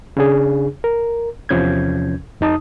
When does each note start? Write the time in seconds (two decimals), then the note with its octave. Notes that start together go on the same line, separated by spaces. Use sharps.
0.17 C#3 D4 G#4
0.84 A#4
1.49 E2 C3 F3 C#4 G6 G#6
2.41 F2 D#4 A5 D#6